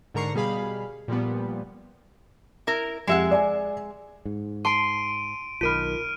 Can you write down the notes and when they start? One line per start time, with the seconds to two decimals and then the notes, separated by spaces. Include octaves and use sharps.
0.14 G#2 D3 A#4 A#5 C#6 C7
0.35 B2 G3 G#4 F5 B5
1.08 A#2 F3 G3 B3
2.67 E4 A#4
3.07 F2 G#3 G4 E5 F#5
3.31 D5 G#5
4.25 G#2
4.65 A5 C6 D7 D#7
5.61 B1 D#3 F4 A#4 B5 F6 D7 D#7